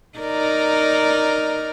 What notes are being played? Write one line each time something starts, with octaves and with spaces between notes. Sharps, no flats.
D#4 A#4 D5